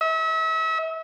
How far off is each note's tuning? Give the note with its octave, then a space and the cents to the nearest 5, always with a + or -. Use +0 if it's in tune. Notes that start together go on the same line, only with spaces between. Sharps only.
E5 -40